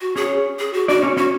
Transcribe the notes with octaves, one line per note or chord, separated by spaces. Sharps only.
F#4
C#4 G#4 C#5
G#4
F#4
D4 F#4 D5
C#4 C#5
C#4 F#4 C#5